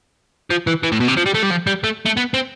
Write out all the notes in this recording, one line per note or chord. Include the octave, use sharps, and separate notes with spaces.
F3
E3
E3
A2
B2
C3
F3
G3
A3
G3
F3
G3
A3
A3
B3
C4